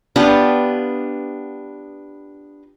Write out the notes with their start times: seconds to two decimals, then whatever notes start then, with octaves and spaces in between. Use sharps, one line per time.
0.16 B3 D4 F4 G4